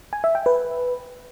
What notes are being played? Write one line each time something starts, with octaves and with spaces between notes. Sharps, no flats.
G#5
E5
G5
B4